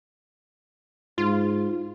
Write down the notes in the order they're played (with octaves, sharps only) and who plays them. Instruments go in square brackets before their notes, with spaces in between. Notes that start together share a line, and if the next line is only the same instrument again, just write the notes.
[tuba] G#2 [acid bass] F4